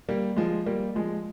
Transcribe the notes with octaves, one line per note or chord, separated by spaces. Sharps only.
G3 A#3
F3 G#3
G3 A#3
F3 G#3